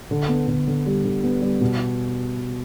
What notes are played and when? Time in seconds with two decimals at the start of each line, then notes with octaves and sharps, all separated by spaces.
0.11 D3
0.29 B3
0.47 D3
0.67 D3
0.86 G3
1.04 D3
1.23 B3
1.42 G3
1.61 B2